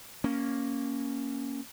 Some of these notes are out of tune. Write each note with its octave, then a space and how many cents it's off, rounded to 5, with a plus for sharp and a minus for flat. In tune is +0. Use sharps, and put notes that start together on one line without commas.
A#3 +0 C#4 +0